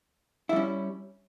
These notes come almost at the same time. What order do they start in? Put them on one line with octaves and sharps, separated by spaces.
E4 G3 C#4